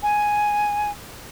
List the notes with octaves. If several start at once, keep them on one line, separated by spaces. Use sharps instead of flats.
G#5